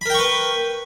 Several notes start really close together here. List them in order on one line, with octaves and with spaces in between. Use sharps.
B5 A#4 G5 C#6 B4